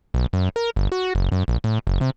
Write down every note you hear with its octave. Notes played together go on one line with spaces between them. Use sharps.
B1
F#2
A#4
G1
F#4
F#1
F#2
A#1
A2
F#1
C3